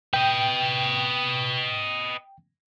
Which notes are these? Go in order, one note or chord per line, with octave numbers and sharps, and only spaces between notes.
B4 D#5 G5